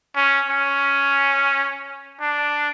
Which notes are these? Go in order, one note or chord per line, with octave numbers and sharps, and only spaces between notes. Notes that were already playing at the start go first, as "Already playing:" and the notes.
C#4
C#4
D4